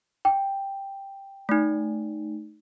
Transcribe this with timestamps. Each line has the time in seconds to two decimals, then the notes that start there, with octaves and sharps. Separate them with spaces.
0.25 G5
1.49 A3 D#4